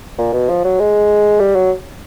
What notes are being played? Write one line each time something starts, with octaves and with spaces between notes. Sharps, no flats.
A#2
B2
F3
F#3
G#3
G3
F#3